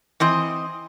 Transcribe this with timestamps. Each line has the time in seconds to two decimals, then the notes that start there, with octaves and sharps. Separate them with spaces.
0.20 E3 C4 D#5